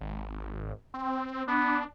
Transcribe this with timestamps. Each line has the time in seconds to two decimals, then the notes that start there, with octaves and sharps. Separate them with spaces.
0.01 G#1
0.94 C4
1.48 B3 D4